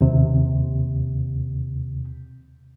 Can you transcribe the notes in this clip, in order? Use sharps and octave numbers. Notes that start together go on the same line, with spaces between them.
D#2 C3